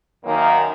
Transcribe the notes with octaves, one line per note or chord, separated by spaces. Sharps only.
F#2 D#3 A#3